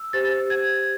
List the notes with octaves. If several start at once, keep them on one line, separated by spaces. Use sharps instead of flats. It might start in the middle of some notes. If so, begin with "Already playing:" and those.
Already playing: E6
G4 C5 A6
G#6